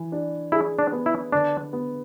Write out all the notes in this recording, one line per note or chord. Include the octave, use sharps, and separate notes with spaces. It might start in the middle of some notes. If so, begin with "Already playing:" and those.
Already playing: E3
D4
E4 G#4
D4
B3
E4
D3 D4
B3